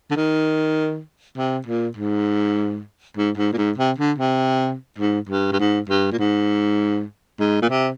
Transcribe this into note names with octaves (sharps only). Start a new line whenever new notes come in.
D3
D#3
C3
A#2
G#2
G#2
G#2
A#2
G#2
C3
D3
C3
G#2
G2
G2
G#2
G2
A#2
G#2
G#2
A#2
C3